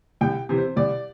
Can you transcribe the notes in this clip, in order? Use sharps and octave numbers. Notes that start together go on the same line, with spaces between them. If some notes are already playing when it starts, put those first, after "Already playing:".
C2 G5
C3 E3
C5
C2 D5